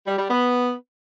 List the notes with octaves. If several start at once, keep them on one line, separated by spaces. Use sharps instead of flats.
G3
G3
B3